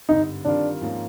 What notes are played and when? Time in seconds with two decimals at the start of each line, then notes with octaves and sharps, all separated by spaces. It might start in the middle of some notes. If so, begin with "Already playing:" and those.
0.09 G#1 G2 D3 G3 D#4
0.45 D#3 G3 C4 D4 F4 A#4
0.81 G#2 F3 A#3 C#4